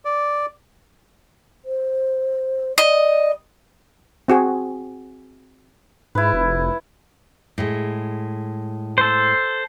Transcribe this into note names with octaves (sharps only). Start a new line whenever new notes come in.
D5
C5
D5 D#5
C4 F#4 G#4
G#2 E4 B4
F1
A2 G#3
A4 C5